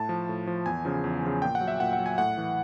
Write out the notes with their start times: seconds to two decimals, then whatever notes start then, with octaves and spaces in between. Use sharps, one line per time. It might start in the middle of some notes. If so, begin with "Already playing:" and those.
Already playing: A2 A5
0.09 F3
0.29 A2
0.47 F3
0.66 E2 G#5
0.85 C#3 F3
1.04 E2
1.23 C#3 F3
1.42 A#2 G5
1.55 F#5
1.61 F#3
1.68 E5
1.80 A#2 F#5
1.93 F#5
1.99 F#3
2.06 G#5
2.18 A2 F#5
2.37 E3